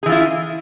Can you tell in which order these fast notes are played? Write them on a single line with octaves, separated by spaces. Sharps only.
G#4 E3 F4 E4